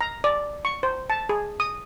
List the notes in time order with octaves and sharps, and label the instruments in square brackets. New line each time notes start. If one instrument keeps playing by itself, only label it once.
[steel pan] A#5
D5
C#6
C5
A5
G#4
D#6